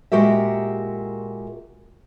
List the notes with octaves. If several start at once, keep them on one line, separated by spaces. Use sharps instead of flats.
A#2 G#3 F#4 G4 A#4 E5